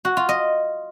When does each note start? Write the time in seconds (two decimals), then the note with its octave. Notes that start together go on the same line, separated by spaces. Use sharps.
0.05 F#4
0.17 F4
0.29 D#5